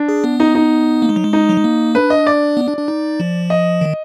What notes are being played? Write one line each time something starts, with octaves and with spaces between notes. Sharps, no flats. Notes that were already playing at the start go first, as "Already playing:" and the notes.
Already playing: D4
G#4
B3
D#4
D#4
A#3
G#3
F#3
G#3
D#4
F#3
G#3
A#3
D4 B4
D#5
D5
B3
D4
D4
D#4
F3
D#5
D#3